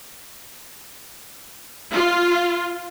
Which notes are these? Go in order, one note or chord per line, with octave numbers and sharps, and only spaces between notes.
F4